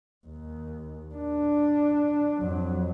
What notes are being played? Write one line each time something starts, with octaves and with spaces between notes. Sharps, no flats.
D#2
D4
F2 F#3